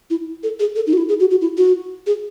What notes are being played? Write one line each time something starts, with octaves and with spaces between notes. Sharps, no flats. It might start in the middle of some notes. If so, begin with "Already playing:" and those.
E4
A4
G#4
A4
D#4
F#4
E4
G#4
F#4
F#4
E4
F#4
G#4